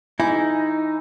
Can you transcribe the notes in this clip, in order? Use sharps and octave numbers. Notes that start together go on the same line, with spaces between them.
E3 D#4 E4